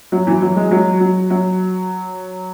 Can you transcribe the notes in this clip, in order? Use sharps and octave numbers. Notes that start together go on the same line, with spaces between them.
F#3
E3
F#3
G#3
F#3
F#3
F#3